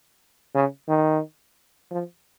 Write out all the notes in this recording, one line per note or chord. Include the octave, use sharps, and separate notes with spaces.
C#3
D#3
F3